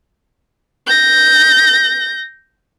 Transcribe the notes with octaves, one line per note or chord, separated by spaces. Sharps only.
G6 A#6